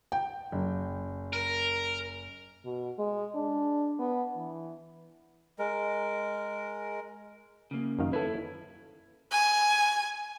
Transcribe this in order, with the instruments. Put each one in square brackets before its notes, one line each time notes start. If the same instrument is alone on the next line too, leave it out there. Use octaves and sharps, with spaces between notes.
[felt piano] G5
F#1
[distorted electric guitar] A#4
[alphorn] B2
G#3
D4
B3
E3
[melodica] G#3 A#4
[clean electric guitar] C#3 A#3
[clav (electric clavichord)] F#2 D#3 F5
[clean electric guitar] E4 C#5 [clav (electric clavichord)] A4 B4
[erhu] G#5